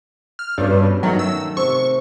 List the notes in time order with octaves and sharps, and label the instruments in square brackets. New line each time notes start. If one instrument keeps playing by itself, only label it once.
[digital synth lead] F6
[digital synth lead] G2 [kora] B2 C#4 A4
[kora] D#3 A3 [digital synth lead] F#3
[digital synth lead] E6
[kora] C3 [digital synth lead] C#6